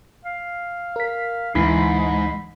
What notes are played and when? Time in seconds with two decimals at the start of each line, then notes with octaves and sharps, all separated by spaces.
0.24 F5
0.96 A#4 B6
1.55 D2 G#2 E3 B5 B6 C7